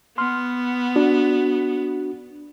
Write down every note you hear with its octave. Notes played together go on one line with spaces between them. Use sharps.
B3 C6 F6
D4 F#4